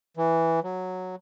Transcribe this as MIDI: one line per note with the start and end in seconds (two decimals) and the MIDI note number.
0.17 0.60 52
0.63 1.16 54